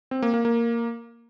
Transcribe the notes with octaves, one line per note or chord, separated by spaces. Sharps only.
C4
A#3
A#3
A#3